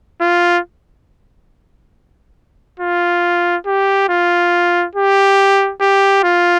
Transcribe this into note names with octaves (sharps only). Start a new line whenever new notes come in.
F4
F4
G4
F4
G4
G4
F4